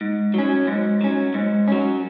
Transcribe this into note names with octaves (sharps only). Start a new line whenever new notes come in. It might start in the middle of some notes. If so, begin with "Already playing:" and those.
G#2
F#3 C#4
G#2
F#3 C#4
G#2
F#3 C#4